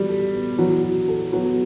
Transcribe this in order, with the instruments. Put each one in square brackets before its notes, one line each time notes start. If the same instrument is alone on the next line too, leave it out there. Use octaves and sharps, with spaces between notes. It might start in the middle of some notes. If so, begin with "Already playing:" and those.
Already playing: [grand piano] E3 B3 F#4 [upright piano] G3
[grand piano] A4
B3
[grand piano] E3 [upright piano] F#3
[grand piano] F#4
A4
[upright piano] F#3 [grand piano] B3